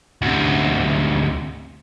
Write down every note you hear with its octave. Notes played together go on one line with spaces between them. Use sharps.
D2 C3